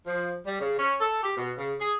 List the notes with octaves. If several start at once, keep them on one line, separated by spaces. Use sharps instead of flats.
F3
G3
C#3
C#4
A4
G4
B2
C#3
G#4